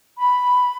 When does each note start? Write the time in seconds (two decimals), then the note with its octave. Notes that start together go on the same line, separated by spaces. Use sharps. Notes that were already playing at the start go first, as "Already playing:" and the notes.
0.18 B5